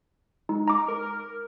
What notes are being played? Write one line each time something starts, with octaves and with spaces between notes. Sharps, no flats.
G#3 D#4
A#5 D6
A#4